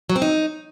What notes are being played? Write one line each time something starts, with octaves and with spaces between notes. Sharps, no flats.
F#3
C4
D#4